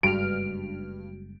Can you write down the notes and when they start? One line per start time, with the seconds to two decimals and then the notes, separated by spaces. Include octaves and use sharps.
0.03 F#1 G2 G3 G#3 F#4 F6 D7